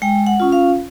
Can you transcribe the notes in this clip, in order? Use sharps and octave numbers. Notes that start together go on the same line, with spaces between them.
G#3 G5
F#5
C#4 F4
F5